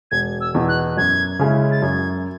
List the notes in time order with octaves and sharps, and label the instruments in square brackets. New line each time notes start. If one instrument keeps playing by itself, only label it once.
[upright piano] E1 [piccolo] G#6
[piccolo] E6
[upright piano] E2 B2
[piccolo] F#6
[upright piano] F#2 [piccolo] G#6
[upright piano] C#3 G#3 C#4 E4
[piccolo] A6
[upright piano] F#2 [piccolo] G#6